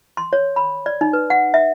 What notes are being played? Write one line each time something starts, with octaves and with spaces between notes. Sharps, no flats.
C6
C#5
B5
D5
D#4
B4
F#5
E5